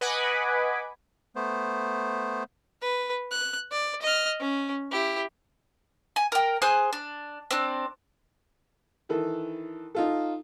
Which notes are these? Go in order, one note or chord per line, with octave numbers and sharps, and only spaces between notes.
B4 D#5 F#5 G#5 B5 D6
A3 B3 C5
B4
F#6
D5
D#5 F6
C#4
E4 G4
G#5
A#4 G5
G#4 C5 G#5 F#6
D4
C4 D4
D#3 E3 A4
D#4 F4 A4